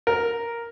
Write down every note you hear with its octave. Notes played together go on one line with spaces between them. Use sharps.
A#4